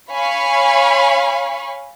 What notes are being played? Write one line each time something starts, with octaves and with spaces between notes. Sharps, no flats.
C#5 F5 G#5 B5 C#6